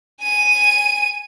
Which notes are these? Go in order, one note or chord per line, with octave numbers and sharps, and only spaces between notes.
G#5 D#7